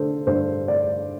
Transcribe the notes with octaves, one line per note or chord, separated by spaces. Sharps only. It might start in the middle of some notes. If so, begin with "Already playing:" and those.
Already playing: D3 A4 C5
G2 C5
D5